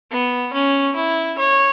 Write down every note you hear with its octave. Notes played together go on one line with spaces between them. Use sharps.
B3
C#4
E4
C#5